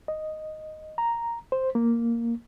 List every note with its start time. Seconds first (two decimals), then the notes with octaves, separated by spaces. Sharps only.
0.08 D#5
0.98 A#5
1.52 C5
1.75 A#3